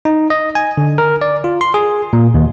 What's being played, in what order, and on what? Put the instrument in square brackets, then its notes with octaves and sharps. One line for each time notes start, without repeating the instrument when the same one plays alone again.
[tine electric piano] D#4
D#5
G#5
D3
A#4
D5
F4
C6
G#4
A#2
D#2